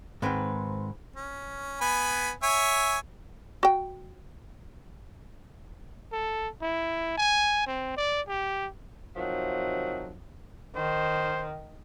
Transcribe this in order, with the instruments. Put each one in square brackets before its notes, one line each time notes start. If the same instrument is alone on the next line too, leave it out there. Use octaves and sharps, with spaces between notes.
[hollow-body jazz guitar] G#2 D#3 [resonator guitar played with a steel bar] G#3 C4 B4
[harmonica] C#4
B3 G#5 B5
C#5 E5 G#5
[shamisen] F#4 G5
[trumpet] A4
E4
G#5
C4
D5
G4
[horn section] C3 D#3 F3 F#3
[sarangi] D#3 [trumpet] C5